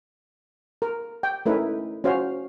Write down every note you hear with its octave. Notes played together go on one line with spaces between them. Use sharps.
A#4
G5
A3 C#4 D#4 E4 A#4 B4
C#4 F#4 C5 F5